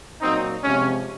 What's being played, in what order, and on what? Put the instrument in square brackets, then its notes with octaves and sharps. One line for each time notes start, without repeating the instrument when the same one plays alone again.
[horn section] A#2 F#3 C4 D#4
C3 F3 G#3 C#4